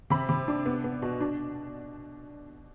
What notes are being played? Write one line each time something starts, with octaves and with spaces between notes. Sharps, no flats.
C3 B5
C3
D4
B3
B3
B2
D4